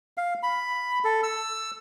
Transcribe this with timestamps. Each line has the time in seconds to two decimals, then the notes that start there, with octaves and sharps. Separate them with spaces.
0.17 F5
0.43 B5
1.04 A4
1.23 E6